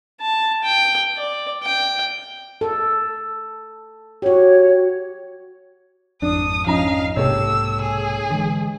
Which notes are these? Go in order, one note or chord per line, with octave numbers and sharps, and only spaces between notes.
A5
G5
D5
G5
A4
F#4 G4 C#5
G#1 F2 D4 D#6
F3 C#4 D#4 F5 A#5
B1 G#2 C3 A#3 G4 A4 C#5 E6
G#4
D3 E3 G#3